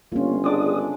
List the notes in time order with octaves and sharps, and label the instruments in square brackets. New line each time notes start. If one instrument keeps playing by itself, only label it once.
[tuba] G1 [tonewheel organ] A#3 [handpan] C#4 F4
[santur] G#3 D4 D5 [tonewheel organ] G#4 D#6